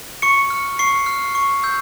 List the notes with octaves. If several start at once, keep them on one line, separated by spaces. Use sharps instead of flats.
C#6 C#7
F6
C#6 C7
F6
C#6
E6 G6